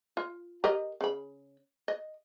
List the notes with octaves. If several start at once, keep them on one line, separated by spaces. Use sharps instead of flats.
F4
G4 A#4 D#5
C#3 B5
D#5